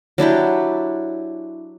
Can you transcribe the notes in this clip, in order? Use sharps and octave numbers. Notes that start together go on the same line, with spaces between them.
F#3 D4 E4 G4